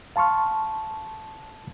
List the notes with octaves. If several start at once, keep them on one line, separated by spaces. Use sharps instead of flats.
F5 A5 C6 C#6 F6